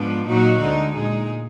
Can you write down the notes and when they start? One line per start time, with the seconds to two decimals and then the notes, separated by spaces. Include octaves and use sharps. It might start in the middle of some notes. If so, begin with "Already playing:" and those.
Already playing: G#2 F3 B3 D4
0.26 A#2 F#3 A#3 D#4 F#4
0.61 D2 D3 G#3 D#4
0.95 A#2 G#3 D#4 G#4